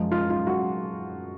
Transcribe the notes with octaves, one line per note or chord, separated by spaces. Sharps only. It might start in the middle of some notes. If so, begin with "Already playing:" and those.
Already playing: F#2 F3 G#3
F4
F4
F#4